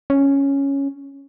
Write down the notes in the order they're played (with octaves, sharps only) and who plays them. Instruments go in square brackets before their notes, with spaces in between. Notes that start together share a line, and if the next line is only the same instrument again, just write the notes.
[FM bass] C#4